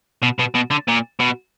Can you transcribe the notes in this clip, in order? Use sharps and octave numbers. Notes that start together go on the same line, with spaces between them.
B2
B2
B2
D3
A#2
B2